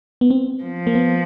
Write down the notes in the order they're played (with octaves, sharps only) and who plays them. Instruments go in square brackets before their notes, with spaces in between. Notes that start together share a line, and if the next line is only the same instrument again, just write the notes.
[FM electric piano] B3
C4
[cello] F3
[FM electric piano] A#3
B3